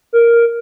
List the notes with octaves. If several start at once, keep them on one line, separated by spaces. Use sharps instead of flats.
A#4